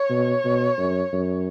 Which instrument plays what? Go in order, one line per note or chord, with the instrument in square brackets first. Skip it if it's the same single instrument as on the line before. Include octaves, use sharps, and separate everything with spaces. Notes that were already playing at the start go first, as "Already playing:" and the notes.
Already playing: [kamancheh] C#5
[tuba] B2
B2
F#2
F#2